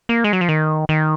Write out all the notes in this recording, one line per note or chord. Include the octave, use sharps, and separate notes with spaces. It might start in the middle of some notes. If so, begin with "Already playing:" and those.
A#3
G#3
F#3
F3
D#3
D#3